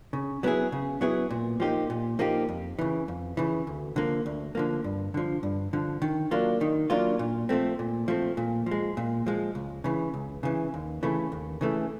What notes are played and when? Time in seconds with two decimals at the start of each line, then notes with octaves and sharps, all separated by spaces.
0.13 C#3
0.43 F#3 B3 E4 G#4
0.72 C#3
1.01 F#3 B3 E4 G#4
1.31 A#2
1.60 F3 A#3 D#4 G4
1.90 A#2
2.19 F3 A#3 D#4 G4
2.49 F2
2.79 C#3 E3
3.08 F2
3.37 C#3 E3
3.67 D2
3.96 D3 F3 A#3
4.26 D2
4.55 D3 F3 A#3
4.84 G2
5.14 D3 F3
5.43 G2
5.73 D3 F3
6.02 D#3
6.31 F#3 A#3 D4 F4
6.61 D#3
6.90 F#3 A#3 D4 F4
7.19 A#2
7.49 F3 A3 C4
7.79 A#2
8.08 F3 A3 C4
8.37 A#2
8.66 F3
8.71 G#3
8.97 A#2
9.26 F3 G#3
9.55 C#2
9.84 C#3 E3
10.14 C#2
10.43 C#3 E3
10.74 D#2
11.03 C#3 E3 A3
11.32 D#2
11.61 C#3 E3 A3